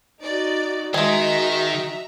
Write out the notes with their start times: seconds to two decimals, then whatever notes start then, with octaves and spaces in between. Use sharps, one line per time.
0.23 D#4 F#4 D5
0.94 D#3 G#3 F#4 D#5 E5 G#5 A#5